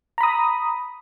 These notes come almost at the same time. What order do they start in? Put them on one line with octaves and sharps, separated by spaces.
A#5 B5 D#6